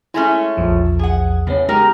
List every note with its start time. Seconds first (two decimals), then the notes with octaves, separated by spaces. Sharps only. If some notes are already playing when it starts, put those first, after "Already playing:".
0.14 G#3 A3 C#4 E4 G#5
0.57 A#1 E2 F3
0.99 G#4 F#5
1.47 A2 C#3 B3 C#4
1.69 G#3 D#4 G4 A#4